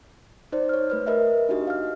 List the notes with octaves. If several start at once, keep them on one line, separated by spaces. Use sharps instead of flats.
D#4 C5 D5
C#5 F6
A3 B4 F6
A#4 B4 D#5 E5
D4 D#4 F#4 G4 D#5
F5 F6